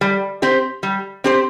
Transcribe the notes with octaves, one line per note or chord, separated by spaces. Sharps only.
G3
C4 G4 C5
G3
C4 G4 C5